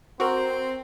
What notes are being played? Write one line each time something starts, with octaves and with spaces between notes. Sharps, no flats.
C4 F#4 A#4